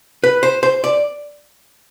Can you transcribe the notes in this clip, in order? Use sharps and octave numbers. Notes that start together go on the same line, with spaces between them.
B4
C5
C5
D5